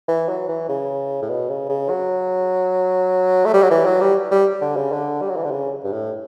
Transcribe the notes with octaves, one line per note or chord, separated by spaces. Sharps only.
E3
F#3
E3
C#3
A2
B2
C#3
C#3
F#3
A3
G3
F#3
E3
F#3
G3
G3
D3
C#3
D3
G3
F#3
E3
D3
C#3
G2
A2